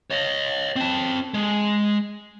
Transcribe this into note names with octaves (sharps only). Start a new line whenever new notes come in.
C#5 D#5
C4 A5
G#3